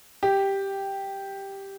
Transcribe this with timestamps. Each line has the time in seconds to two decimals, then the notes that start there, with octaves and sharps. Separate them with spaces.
0.23 G4